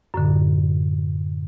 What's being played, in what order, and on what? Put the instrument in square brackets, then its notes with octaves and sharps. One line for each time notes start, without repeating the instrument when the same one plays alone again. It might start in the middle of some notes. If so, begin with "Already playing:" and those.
[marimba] F#2 A2 D3